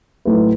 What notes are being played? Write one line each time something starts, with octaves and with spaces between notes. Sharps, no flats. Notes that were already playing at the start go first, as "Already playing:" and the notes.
A2 F#3 A3 E4 B4